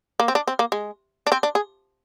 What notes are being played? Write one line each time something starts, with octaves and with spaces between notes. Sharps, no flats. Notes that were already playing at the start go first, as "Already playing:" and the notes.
A#3
C4
D4
C4
A#3
G#3
D4
C4
D4
G#4